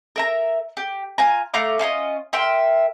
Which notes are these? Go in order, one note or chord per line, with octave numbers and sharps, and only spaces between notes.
A#4 E5 A#5
G4
F4 G#5 A#5
A3 F5 A#5 D6
C#4 F4 C#5 D#5
A#4 E5 G5 C6